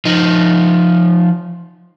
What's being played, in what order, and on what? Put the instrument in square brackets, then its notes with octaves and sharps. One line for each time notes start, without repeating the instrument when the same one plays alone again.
[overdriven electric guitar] F3 D#4